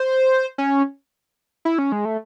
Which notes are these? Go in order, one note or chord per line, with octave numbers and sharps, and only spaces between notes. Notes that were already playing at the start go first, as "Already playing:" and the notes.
Already playing: C5
C#4
E4
C#4
G#3
A3